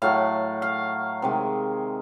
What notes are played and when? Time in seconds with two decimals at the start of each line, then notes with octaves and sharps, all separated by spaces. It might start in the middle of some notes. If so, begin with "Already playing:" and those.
0.02 A2 F#3 A3 F5
0.62 F5
1.22 C3 D#3 G#3